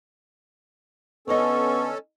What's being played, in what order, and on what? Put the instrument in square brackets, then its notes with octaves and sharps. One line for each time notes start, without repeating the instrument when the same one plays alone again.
[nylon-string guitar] D3 D#4 D#5 [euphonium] B3 [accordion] C#4 A4 [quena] C#6